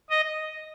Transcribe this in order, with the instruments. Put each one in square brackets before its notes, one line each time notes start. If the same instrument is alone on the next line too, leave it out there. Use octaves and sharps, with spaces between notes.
[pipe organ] D#5